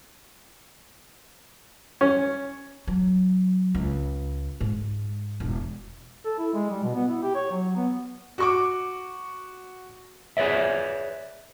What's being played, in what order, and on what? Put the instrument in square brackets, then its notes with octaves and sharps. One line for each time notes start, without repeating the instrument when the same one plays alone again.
[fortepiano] C#4
[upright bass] F#3
C#2
G#2
E1
[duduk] A4
E4
G#3
G3
B2
B3
E4
G4
C#5
F#3
B3
[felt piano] F#4 C#6 D6
[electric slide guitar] G#4 B4 C#5 D5 E5